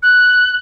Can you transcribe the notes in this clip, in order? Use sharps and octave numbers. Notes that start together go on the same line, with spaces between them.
F#6